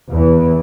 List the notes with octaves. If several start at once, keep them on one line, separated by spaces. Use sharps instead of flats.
E2